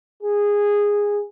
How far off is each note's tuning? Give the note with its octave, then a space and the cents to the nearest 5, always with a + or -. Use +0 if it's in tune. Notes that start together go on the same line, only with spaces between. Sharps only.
G#4 -15